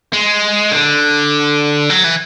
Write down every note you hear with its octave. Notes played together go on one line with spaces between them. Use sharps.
G#3
D3
F#3
E3